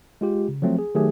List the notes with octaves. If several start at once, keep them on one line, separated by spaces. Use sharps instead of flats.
G#3 F4 G4
C#3
F3 F#3 A3 C4
G#4
D#3 F#3 A3 G4 G#4